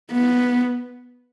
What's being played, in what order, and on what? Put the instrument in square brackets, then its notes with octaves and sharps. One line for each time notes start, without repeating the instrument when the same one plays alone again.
[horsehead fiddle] B3